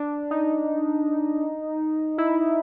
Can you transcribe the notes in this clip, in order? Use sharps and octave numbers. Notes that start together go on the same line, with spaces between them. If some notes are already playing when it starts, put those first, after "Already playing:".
Already playing: D4
D#4
E4